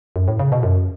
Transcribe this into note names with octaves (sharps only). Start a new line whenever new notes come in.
F#2
A2
C#3
B2
F#2